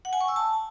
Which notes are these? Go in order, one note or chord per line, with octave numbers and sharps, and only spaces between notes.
F#5
G#5
C#6
E6
A5